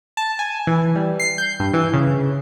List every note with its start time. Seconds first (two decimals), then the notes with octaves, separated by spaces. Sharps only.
0.17 A5
0.39 G#5
0.67 E3
0.96 G3
1.20 C7
1.38 G6
1.60 G2
1.74 E3
1.94 C#3